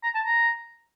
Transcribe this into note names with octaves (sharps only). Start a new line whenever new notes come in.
A#5
A5
A#5